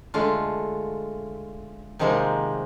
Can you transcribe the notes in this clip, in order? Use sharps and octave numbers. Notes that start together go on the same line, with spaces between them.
D3 G#3 A3 F4
C3 D#3 F3 G#3 A#3 C4